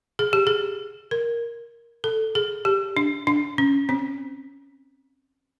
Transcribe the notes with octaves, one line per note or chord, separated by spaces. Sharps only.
G#4
G4
G#4
A#4
A4
G#4
G4
D4
D4
C#4
C4